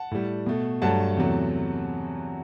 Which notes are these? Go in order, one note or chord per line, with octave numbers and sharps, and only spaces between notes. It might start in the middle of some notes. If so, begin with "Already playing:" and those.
Already playing: F#5 A5
A2 G3
B2 A3
G2 F#3 A3 F#5 A5
E2 C3 F#3 A3